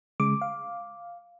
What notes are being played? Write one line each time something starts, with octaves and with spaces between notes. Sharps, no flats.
C#3 G#3 D6
F5